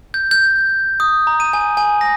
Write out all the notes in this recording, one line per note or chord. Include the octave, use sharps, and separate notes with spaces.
G6
G6
D#6
A#5
D#7
G#5
G#5
A#6